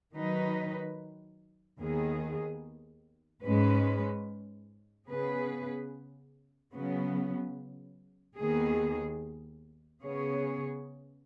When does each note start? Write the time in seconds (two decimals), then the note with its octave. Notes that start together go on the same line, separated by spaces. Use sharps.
0.15 D#3 F#3 D#4 B4
1.79 D#2 D#3 B3 G#4
3.44 G#2 G#3 C#4 B4
5.09 C#3 B3 G#4 B4
6.73 C#3 F#3 B3
8.38 D#2 D#3 B3 G#4
10.03 C#3 B3 G#4 C#5